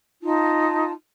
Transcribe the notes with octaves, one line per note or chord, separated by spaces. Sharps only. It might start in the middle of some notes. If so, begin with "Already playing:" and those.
D#4 F4 A5